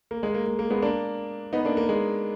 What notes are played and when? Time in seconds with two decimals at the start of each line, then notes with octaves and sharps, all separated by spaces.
0.11 A#3
0.23 G#3
0.34 A#3
0.46 A#3
0.59 A#3
0.70 G#3 B3
0.82 A#3 D4
1.53 B3 D#4
1.65 A#3 D4
1.77 A#3
1.89 G#3